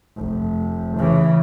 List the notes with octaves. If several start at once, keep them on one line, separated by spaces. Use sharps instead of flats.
F1
C#3 E3